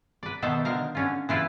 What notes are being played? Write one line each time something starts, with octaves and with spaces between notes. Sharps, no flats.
B4 D5
B2 D#3 A4 C5 E5
D3 D#3 A#4 F5 A#5
D3 C#4 F4
E3 E4 F4 G4 B4